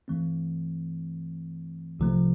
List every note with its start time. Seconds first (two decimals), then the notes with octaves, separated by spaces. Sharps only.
0.08 G2 E3 A3 C4
2.00 C2 C3 F3 A3